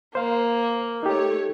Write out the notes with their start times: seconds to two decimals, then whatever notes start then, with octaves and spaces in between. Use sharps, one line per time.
0.15 A#3 C5 F5
1.03 A3 D#4 G4 C#5